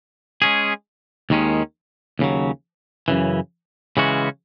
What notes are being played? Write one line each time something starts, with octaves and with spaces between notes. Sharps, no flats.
G#3 C#4 G#4
D#2 D#3 G#3 C#4
D#2 C#3 F#3
F#2 C#3 E3
C#3 E3 G#3 C#4 F#4